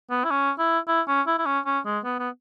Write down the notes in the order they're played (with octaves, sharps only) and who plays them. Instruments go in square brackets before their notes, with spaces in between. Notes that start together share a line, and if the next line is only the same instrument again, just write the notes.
[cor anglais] B3
E4
C#4
E4
E4
C#4
E4
E4
C#4
C#4
G#3
B3
B3